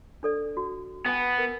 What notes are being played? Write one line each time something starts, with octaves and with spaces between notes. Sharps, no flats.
D4 A4 D5
F#4
B3 G5 G#5
A#4